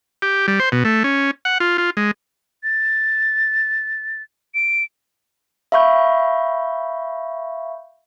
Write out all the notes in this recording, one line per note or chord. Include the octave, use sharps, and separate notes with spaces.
G4
G3
C5
B2
A3
C#4
F#5
F4
F4
G#3
A6
D7
E5 F5 B5 C#6 G6